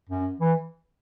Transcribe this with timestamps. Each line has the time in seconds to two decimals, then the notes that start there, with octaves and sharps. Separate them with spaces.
0.09 F#2
0.40 E3